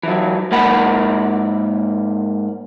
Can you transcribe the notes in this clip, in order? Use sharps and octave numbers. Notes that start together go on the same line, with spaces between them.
E3 F#3
G#2 A#3 F#5 B5